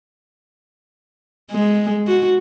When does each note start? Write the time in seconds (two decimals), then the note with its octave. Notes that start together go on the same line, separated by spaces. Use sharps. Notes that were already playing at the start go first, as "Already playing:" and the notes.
1.51 G#3
2.08 F#4